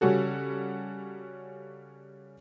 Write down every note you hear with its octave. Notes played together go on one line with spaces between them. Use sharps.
C#3 G3 C#4 F#4 A4